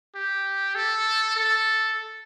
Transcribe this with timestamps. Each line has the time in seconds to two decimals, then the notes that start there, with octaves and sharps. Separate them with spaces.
0.15 G4
0.76 A4
1.36 A4